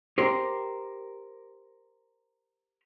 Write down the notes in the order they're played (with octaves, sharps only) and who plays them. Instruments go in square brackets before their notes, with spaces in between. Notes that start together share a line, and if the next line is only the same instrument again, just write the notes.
[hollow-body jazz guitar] G4 A#4 C5